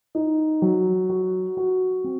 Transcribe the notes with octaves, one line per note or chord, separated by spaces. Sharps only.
D#4
F#3
F#4
F#4
C4